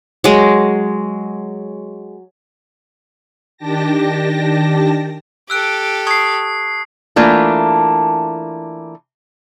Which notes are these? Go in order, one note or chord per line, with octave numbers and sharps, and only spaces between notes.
F#3 G#3
D#3 D4 G4 G5 A5 A#6
G4 A4 E6 F#6 D7
A5 C#6 D#6 G#6 C7
E3 A3 A#3 D4 F4